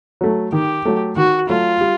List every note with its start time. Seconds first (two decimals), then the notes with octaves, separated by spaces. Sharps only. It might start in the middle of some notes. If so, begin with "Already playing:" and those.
0.21 F#3 A3
0.52 D#3 G4
0.85 F#3 A3
1.17 D#3 F#4
1.49 F#3 A3 F4
1.81 G3